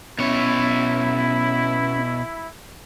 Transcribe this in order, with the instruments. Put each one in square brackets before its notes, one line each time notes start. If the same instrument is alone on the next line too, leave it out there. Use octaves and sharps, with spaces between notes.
[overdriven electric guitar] B2 C#5 [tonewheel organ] B3 C#4 [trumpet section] E4